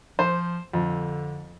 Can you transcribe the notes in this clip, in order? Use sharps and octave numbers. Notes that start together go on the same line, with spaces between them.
F3 C5
F2 D3